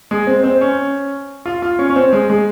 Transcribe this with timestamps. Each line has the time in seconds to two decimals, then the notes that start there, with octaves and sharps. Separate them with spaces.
0.11 G#3
0.27 C4
0.44 C4
0.61 C#4
1.46 F4
1.62 F4
1.79 C#4
1.90 C#4
1.96 C4
2.13 G#3
2.30 G#3